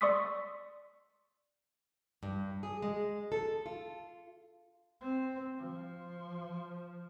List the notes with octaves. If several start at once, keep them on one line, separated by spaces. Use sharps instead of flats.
D5 C6 C#6 D#6 E6 B6
G2
G#4
G#3
A4
F4
C4
F3